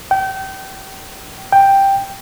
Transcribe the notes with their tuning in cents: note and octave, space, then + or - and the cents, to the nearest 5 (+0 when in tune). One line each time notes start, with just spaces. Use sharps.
G5 -30
G5 +5